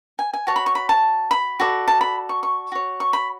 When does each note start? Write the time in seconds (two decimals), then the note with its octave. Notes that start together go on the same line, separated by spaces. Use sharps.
0.19 G#5
0.34 G#5
0.47 F#4 C#5 A5
0.56 B5
0.66 C#6
0.75 B5
0.89 A5
1.31 B5
1.60 F#4 A4 D5
1.88 A5
2.01 B5
2.29 C#6
2.43 C#6
2.72 F#4 C#5
3.00 C#6
3.13 B5